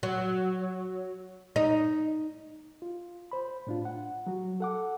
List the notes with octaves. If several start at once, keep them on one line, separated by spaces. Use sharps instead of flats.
F#3
D#4
F4
C5 B5
A2 D4 F4
F#5
F#3 F#4
A4 F#5 D6